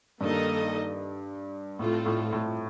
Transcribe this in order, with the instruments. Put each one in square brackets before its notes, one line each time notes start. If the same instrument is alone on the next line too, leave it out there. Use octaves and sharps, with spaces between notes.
[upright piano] G2 [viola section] D#3 A#3 D#4 A4 D#5
[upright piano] A2 [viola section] A3 C4 F4 A4
[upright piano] A2
A2